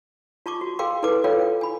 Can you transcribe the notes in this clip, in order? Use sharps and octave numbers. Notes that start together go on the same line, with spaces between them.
F4 A5 C#6 D6
F#4
G#4 A#4 F5 G5 C6 D6
E4 A4 B4 A5 D6
F4 A4 A#4 C#5 F5 G5
G#5 B5